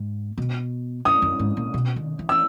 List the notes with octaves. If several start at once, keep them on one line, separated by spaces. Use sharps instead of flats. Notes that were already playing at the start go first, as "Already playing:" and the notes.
Already playing: G#2
B2
F#2 D#6
F#2
G#2
A#2
B2
D#3
E3
E6